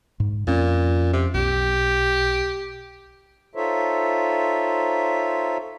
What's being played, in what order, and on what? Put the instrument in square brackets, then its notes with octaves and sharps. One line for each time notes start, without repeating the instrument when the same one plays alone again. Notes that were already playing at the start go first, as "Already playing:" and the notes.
[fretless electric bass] G#2
[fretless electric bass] F2 C#4 [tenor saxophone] A#2
[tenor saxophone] C3
[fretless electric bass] B1 [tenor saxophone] G4
[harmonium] D#4 F4 A4 C5 C#5 E5